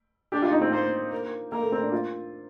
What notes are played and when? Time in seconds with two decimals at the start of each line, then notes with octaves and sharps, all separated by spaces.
0.32 D4 G4
0.42 F4
0.51 D#4
0.61 C4
0.72 A#3 C5
1.12 A#4
1.52 A#3 A#4
1.62 A3
1.72 C4
1.82 D4
1.92 F4